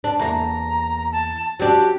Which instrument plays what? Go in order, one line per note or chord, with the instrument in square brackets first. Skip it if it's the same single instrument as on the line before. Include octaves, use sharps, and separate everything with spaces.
[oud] D4
[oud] E2 A#3 [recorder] A#5
[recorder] A5
[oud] F#3 D4 [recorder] G4